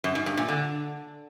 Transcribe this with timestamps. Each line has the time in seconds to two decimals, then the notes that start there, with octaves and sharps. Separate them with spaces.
0.04 F#2
0.15 G#2
0.26 G2
0.37 A#2
0.48 D3